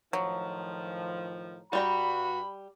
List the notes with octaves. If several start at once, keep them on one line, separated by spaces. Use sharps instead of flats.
A2 D#3 F3 F#3
G2 G3 F#4 G5 A#5 B5